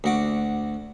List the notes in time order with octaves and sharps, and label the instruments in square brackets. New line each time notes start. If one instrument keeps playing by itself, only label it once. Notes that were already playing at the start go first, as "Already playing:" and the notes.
[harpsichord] D2 F#4 D6